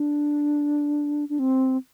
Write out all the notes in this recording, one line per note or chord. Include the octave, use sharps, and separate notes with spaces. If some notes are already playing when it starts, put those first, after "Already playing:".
Already playing: D4
D4
C4